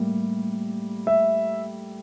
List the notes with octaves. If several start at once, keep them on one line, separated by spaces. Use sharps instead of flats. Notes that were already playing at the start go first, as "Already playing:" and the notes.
Already playing: A2 G3 A#3
E5